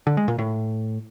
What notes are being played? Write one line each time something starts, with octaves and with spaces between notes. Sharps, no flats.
D3
G#3
A#2
A2